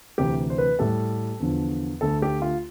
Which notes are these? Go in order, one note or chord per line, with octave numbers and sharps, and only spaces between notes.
D2 C3 E3 G4
C5
B4
A2 G3 A4
E2 D3 F3
D2 D3 A3 A4
G4
F4